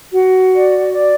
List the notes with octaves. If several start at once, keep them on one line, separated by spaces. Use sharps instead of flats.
F#4
D5
D5